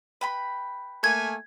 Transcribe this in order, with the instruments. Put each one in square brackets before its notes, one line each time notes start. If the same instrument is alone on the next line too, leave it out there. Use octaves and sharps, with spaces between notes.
[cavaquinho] B4 G5 B5
[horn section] A3 A#3 G#5 [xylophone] G#6